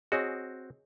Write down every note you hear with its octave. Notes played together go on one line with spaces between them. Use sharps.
C4 F#4 G#4 C#5 D#5